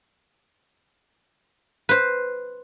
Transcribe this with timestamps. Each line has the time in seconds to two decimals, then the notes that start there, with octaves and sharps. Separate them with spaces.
1.89 B4 C5